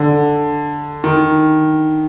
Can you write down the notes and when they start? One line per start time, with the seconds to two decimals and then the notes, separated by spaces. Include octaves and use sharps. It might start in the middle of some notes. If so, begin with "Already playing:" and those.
Already playing: D3
1.04 D#3